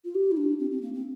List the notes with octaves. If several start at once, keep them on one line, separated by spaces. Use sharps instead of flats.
F4
G4
E4
D4
C4
C4
A#3
C4